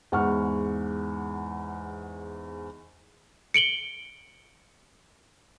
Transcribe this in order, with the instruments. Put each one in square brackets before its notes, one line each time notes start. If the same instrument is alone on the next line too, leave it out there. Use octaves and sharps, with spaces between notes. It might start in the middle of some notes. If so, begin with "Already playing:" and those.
[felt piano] E2 G#2 F#5 C#6 F6
[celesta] C#7 D7 F#7 G7